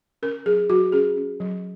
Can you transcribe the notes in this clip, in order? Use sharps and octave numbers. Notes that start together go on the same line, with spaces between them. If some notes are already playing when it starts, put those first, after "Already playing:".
C#4 A#4
F#3 G#4
F#3 F#4
C#4 G#4
C#4
F#3